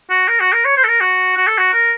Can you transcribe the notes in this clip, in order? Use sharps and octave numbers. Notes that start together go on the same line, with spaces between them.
F#4
A#4
F#4
A#4
C#5
C5
A4
A#4
F#4
F#4
A4
F#4
A#4